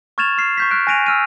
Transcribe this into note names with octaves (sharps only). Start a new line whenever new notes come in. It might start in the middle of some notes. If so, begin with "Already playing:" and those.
C#6 F6 G#6 A6 E7 F7
F6 C7
C#6 G6 B6
F6 F#6 D7
G#5 F#6 A#6 D7 D#7 F7
E6 F6 D#7